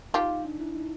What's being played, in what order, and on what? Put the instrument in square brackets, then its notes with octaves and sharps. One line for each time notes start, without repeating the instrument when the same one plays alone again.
[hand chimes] D#4 [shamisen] F4 G4
[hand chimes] D#4
D4
E4
D#4